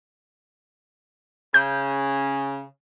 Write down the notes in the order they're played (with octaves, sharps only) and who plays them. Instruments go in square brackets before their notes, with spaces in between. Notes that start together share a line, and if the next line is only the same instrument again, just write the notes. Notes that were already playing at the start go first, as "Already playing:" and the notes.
[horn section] C#3 [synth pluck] G6